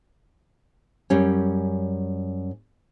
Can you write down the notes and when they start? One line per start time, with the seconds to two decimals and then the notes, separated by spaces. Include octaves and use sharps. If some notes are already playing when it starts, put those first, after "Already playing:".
1.10 F#2 G3 C#4